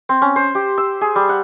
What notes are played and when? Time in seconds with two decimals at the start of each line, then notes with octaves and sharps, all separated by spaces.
0.09 C4
0.22 C#4
0.36 C5
0.55 G4
0.78 E6
1.01 G#4
1.16 G3
1.29 F#5